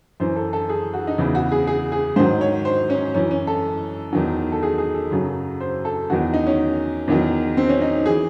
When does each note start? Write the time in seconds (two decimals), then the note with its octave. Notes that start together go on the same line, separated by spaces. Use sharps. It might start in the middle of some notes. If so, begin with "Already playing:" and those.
0.20 F#2 E3 C5
0.36 A4
0.53 A4
0.69 G#4
0.94 F#4
1.07 D#4
1.18 E2 C#3 E3 E4
1.35 F#4
1.52 G#4
1.67 G#4
1.92 G#4
2.16 G#2 D#3 F#3 C5
2.41 C#5
2.65 C5
2.90 C#4
3.15 F#2 E3 C#4
3.31 C#4
3.47 A4
4.13 E2 D#3 F#3
4.52 A4
4.63 G#4
4.78 G#4
4.94 A4
5.11 F#2 C#3 F#3
5.61 C5
5.85 A4
6.10 E2 D#3 F#3 F#4
6.34 D#4
6.47 C#4
7.08 E2 D#3 F#3
7.57 C4
7.69 C#4
7.81 D#4
8.06 E3 G#4